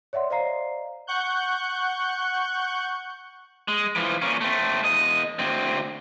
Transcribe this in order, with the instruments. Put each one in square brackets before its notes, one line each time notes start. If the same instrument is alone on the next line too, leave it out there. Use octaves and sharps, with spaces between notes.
[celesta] C#5 D5 E5 F#5 C6
C5 D5 D#5 F5 A#5 C7
[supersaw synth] F#5 C#6 F#6 G6
[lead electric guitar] G#3
E3 F3
A#2 C#4
A3 C4
E2 D#5
D2 C4